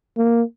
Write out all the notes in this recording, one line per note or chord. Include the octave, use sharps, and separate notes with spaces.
A#3